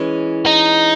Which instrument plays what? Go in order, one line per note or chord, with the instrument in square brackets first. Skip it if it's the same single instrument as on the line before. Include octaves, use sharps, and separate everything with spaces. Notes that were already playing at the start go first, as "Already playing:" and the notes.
Already playing: [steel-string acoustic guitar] E3 G#3 C#4
[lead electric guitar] D#4